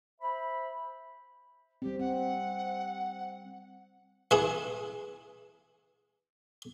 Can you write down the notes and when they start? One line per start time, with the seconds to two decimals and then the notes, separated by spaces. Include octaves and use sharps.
0.21 C5 E5 B5
1.82 G3 C4 G4
1.99 C4 F#5
4.31 E3 E4 G#4